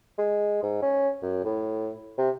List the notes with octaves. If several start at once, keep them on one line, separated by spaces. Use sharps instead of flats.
G#3
G#2
C#4
F#2
A2
C3